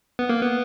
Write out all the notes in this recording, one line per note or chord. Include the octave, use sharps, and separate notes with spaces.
B3
A#3
B3